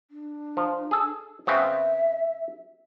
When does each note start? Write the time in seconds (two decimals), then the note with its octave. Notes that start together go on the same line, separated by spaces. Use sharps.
0.11 D4
0.57 F3
0.91 G#4 A4
1.47 C#3 B3 C4 E5